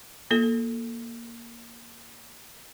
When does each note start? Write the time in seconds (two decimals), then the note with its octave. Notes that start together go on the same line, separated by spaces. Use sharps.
0.31 A#3 F4 A4